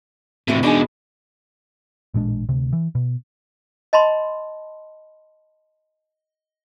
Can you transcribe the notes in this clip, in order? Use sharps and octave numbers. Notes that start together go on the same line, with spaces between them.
A2 C3 E3 C4 F#4
B2 G#3 D4 D#4 G#5
A1 A#2 G#3 D4
D2 C3
E3
B2
D#5 A5 B5 C6